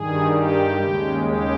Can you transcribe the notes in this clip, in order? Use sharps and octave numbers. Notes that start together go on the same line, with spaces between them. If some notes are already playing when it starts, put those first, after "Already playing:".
Already playing: G2 D#3 G3 G#4
G4
D#2 C#3 G#3
G4